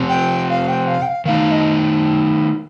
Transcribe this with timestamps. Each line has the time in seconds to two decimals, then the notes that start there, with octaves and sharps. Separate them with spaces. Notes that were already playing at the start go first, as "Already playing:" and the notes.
Already playing: C3 F3 C4 G4
0.09 G5
0.49 F5
0.68 G5
0.87 F5
1.02 G5
1.07 F5
1.26 D#3 A3 D#4 F5
1.51 D#5